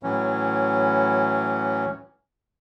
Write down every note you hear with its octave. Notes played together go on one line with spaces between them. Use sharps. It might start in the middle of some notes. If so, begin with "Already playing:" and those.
A2 E3 F#3 C#4